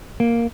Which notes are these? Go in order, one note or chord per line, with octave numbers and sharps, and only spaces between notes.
A#3